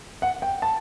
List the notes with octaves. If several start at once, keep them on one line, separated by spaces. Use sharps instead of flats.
F#5
G5
A5